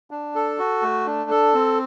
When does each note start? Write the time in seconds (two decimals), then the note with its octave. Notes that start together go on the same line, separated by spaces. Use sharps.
0.11 D4
0.35 A4
0.58 F#4
0.82 A3
1.06 D4
1.30 A4
1.54 C4